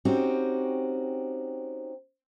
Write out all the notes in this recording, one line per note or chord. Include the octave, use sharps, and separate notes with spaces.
C4 C#4 D#4 F#4 G4